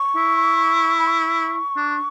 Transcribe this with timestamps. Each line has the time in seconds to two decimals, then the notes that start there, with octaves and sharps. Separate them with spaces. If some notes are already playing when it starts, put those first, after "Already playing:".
Already playing: C#6
0.16 E4
0.98 B5
1.07 C#6
1.77 D4